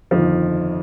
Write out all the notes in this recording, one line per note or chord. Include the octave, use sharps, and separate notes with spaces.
G1 F2 D#3 F3